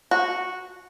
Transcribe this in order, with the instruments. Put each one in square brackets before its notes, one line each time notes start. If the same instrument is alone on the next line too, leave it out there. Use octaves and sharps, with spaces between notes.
[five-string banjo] F#4